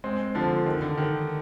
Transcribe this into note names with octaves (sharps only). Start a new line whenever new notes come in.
G#3 C4
D3 F3
D#3
D3
D#3